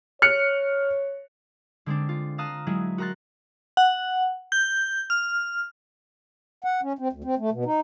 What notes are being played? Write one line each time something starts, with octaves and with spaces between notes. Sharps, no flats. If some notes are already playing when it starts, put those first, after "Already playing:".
C#5 F6 F#6 C#7
D3 G#3 C4 D4
F4
F5 A5 A#5 D#6 F6 F#6
F#3 G#3 E4 G#4
F#4 A#4 A#5 C6 F#6 A6
F#5
G6
F6
F#5
C#4
C4
D2
C4
A3
B2
D#4